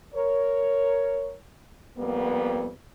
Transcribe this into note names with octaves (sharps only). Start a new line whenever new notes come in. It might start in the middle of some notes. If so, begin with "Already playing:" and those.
A#4 C#5
F2 G3 A#3 B3